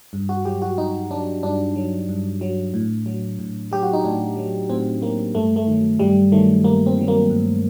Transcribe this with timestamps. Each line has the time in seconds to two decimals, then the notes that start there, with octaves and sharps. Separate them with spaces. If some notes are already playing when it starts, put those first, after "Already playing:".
0.13 G2
0.29 F#4
0.45 F#3 G4
0.62 F#4
0.78 G2 D#4
1.11 F#3 D4
1.43 G2 D4
1.76 F#3
2.09 G2
2.41 F#3
2.74 A2
3.06 F#3
3.39 A2
3.72 F#3 G4
3.83 F#4
3.93 D#4
4.04 A2 D4
4.37 F#3
4.69 A2 C4
5.01 F#3 A#3
5.34 G2 A3
5.56 A3
5.67 D#3 F#3
5.99 G2 G3
6.32 D#3 F#3 A3
6.64 G2 A#3
6.86 C4
6.98 D#3 F#3
7.08 A#3
7.30 G2